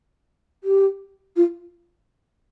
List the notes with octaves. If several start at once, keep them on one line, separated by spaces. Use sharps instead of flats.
G4
F4